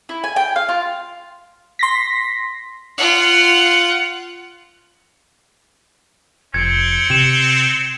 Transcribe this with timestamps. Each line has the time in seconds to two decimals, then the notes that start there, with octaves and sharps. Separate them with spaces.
0.09 E4
0.24 G#5
0.36 G5
0.56 F5
0.69 F4
1.79 C6 A#6 B6
2.98 F4 F#5
6.54 F1 C4 G#6 C#7
7.10 C3 G#6 E7